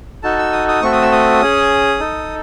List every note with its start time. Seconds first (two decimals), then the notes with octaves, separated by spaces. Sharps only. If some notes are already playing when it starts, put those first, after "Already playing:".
0.23 D#4 F#4 A4 A5
0.38 E6
0.52 D#6
0.68 D#6
0.82 A3 C4 F#4 A4 C#6
0.92 D#6
1.02 E6
1.12 D#6
1.41 C#4 G#4
2.00 D#4 A4